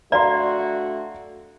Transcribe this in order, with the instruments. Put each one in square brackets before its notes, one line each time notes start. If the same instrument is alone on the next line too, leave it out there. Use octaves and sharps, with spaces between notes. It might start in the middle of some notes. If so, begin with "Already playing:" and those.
[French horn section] D3 A3 F#4 [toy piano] D5 [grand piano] F5 A#5 C6